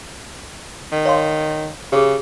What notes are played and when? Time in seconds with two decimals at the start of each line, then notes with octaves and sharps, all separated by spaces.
0.92 D#3
1.05 C#5 F5 C6
1.92 C#3 G4 G#4